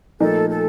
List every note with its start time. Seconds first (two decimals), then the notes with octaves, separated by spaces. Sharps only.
0.20 A#2 F3 A3 D#4 A4
0.49 A4